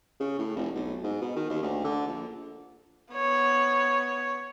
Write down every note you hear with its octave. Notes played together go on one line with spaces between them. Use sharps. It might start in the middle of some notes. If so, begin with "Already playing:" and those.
C#3
A2
F1
B1
G#2
B2
D#3
D#2
D2
D3
A#1
B3 C#5